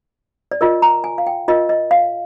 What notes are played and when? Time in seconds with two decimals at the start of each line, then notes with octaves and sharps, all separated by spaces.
0.51 D5
0.61 F4 A#4 D#5
0.82 A#5
1.04 G#5
1.18 F5
1.27 G5
1.48 F4 A#4 D#5
1.69 D#5
1.91 F5